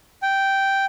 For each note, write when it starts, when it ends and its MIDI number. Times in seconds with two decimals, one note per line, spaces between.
0.22 0.85 79